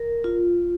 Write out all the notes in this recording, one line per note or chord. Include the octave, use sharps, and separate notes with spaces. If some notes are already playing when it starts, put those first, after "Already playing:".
Already playing: A#4
F4